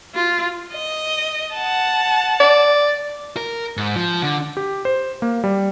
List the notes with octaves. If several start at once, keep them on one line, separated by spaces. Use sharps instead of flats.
F4
D#5
F#5 A5
D5
A#4
G#2
F3
D3
G4
C5
A#3
G3